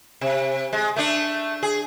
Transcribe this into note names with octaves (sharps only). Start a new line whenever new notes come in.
C3
G#3
A3 D4
G#4